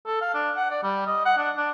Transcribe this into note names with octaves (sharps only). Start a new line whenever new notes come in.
A4
F5
D4
F#5
D5
G3
D#5
F#5
D4
D4